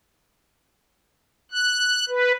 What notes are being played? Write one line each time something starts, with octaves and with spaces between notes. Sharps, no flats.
F#6
B4